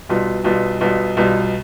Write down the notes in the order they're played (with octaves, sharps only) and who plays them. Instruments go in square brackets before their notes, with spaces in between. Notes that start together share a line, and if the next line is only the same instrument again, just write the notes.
[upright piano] B1 B2 G3 B3 F4
B1 B2 G3 B3 F4
B1 B2 G3 B3 F4
B1 B2 G3 B3 F4